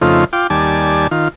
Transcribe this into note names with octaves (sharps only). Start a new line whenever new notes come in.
F2 C#3 A3 D#4 F4 C5
F4 G5 D6
D#2 G3 D5 G#5 A5
D#3 F4